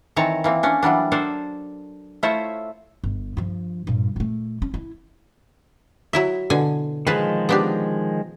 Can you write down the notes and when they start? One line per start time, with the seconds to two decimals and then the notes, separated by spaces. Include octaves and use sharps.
0.16 D#3 E3 C4 C#5 A5 A#5
0.44 E3 A#3 C4
0.63 C#4 D4
0.83 E3 F#3 G3 D4
1.12 D4 A4 A#4 C5 D5
2.23 A3 E4 F4 C5 C#5 E5
3.04 G1
3.37 G2 F3
3.87 G2 A#2
4.16 A#2 A3
4.62 C#4
4.74 E4
6.13 F#3 E4 E5
6.50 B2 D3 G#5
7.07 D#3 F3 G#3 G#4 B4 A5
7.49 B3 D4 G4